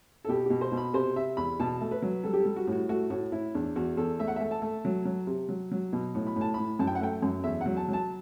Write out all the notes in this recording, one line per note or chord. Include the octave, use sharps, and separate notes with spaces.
A4
B2 G4
B2 G4
C5
B2
B5
C3 C5
C3 E5
E2 B5
B2 A5
A3
B4
F#3
G3 A4
G4
A4
G3
F#4
A2
F#4
A3 F#4
A2 F#4
A2 E4
E2 D4
E2 F#4
E2 A4
A3 E5
F#5
A3 E5
A5
A3
F#3
F#3
C3
F#3
F#3
B2
A2
B5
A2
A5
A2 B5
F#2 A5
G5
F#5
A3 G5
F#2
E2 E5
F#3 F#5
A5
F#3
A5